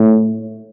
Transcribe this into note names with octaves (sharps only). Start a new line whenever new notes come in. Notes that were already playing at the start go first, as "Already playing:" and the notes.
Already playing: A2